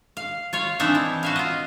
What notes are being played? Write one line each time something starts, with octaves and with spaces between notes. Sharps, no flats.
F5
F4 C#5 F5
E3 C4 D4 D#4 C#5 E5
E4
F#4 E5 F5
F4 D#5